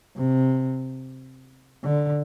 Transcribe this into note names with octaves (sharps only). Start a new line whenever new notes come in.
C3
D3